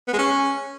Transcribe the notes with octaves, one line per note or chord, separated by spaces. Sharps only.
B3
G#3
C#4